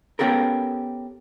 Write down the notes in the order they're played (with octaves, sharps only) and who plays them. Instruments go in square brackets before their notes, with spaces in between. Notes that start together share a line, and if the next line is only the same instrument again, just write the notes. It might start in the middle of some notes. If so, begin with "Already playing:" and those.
[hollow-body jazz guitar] B3 C#4 G4 A4 A#4